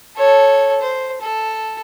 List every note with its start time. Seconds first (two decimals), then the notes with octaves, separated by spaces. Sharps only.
0.17 A4 C#5
0.81 C5
1.22 A4